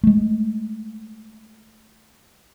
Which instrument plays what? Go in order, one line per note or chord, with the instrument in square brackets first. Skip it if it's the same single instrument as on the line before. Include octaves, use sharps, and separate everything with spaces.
[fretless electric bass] G#3 A3